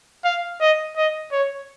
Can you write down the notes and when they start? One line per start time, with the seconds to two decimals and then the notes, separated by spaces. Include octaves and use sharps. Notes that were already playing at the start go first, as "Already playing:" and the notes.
0.25 F5
0.61 D#5
0.97 D#5
1.32 C#5